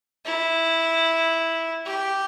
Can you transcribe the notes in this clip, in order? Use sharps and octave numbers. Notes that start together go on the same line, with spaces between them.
E4
G4